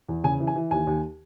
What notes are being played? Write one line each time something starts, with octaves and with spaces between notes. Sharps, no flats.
E2
C#3 G#5
E3
G#5
E3
D#2 G#5
D#2